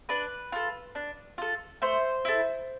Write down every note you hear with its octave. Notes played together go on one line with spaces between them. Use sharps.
D4 B4
F4 A4
D4
F4 A4
A3 C5
E4 A4